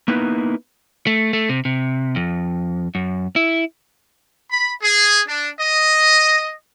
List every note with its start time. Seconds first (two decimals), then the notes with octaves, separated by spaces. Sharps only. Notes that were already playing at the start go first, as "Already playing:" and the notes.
0.08 A#3 B3 D#4 E4 B4
1.07 A3
1.33 A3
1.49 C3
1.65 C3
2.16 F2
2.95 F#2
3.36 E4
4.51 B5
4.82 G#4
5.28 D4
5.59 D#5